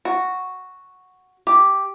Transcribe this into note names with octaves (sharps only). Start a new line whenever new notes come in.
F#4
G4